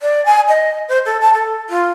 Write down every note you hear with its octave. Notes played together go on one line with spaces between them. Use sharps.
D5
G#5
D#5
C5
A4
A5
A4
F4